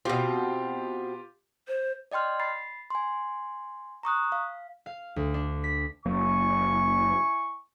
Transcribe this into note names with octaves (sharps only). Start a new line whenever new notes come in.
B2 C4 F4 G4
C5
D5 D#5 G5 C6 F6
B5 A6 C7
G#5 C6
A#5 C#6 D#6 F#6
F5
F5
D2
D4
B6
F#1 F#3 A#3 E4 G#5 C#6